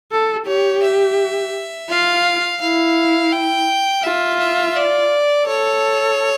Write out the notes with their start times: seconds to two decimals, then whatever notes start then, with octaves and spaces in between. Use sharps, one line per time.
0.12 A4
0.47 G4 C#5
0.83 E5
1.90 F4 F5
2.61 E4 F5
3.32 G5
4.03 F4 E5
4.39 E5
4.76 D5
5.47 A4 C#5